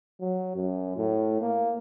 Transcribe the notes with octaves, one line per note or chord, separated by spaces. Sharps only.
F#3
F#2
A2
A#3